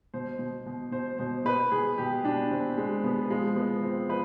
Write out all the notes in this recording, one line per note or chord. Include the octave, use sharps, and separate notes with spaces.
B2 C5
B2
B2
B2 C5
B2 C5
B2 B4
B2 G#4
B2 G4
B2 D4
B2 C4
B2 G#3
B2 B3
F3 G#3
F3 B3
F3 C4
F3 B4